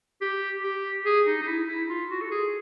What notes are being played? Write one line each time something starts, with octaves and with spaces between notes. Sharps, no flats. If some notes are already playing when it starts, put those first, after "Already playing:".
G4
G4
G#4
D#4
D#4
E4
E4
F4
F#4
A4
G#4